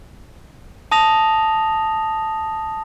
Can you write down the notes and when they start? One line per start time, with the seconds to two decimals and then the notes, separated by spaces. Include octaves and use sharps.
0.92 A5 D#6 A#6 F7